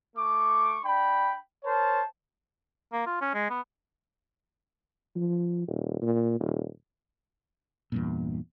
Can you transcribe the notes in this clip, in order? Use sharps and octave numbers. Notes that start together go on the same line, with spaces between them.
A3 C#6 D6
D4 G5 B5
A#4 C5 C#5 A5
A#3
F4
C#4
G#3
B3
F3
D#1
A#2
D#1
E2 G2 A#2